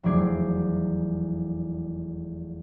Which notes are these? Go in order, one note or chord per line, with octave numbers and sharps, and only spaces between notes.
F1 E2 F#3 D5 G#6 C7